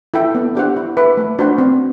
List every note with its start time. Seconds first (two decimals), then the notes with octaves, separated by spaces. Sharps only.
0.14 E4 A4 E5 G5
0.35 B3
0.55 D4 G4 C5 F#5
0.76 E4
0.97 B4 E5
1.17 A3
1.39 D4 F#4 C5 F#5
1.58 C4